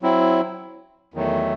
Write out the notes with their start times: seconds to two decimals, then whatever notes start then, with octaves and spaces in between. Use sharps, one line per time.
0.02 F#3 C4 E4
1.14 E2 D#3 F#3 A3